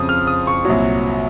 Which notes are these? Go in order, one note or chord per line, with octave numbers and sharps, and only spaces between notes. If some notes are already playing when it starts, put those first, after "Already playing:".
Already playing: F2 C#3 F3 D#6
F6
D#6
C#6
C2 A#2 F#3